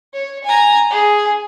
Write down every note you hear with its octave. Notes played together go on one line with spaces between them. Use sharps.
C#5
G#5 A#5
G#4